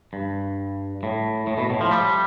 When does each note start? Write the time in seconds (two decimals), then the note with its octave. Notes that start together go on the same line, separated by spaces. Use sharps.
0.13 G2
1.03 A2
1.47 A2
1.58 B2
1.70 A2
1.81 F3
1.91 G3